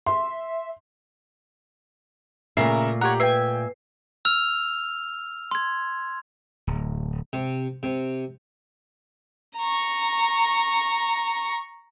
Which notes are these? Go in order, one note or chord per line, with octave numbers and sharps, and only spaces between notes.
E5 C6
A#2 C#3 A3 A#4 E5 A#5 C7
G4 C#5 F#5 A#5
B4 E5 G5 G#5 C7
E6 F6 F7
C6 G#6
D1
C3
C3
A#5 C#6